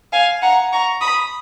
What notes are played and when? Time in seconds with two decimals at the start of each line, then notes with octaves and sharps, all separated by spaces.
0.13 F5 G#5
0.42 F#5 A#5
0.72 A#5 C#6
1.01 B5 D#6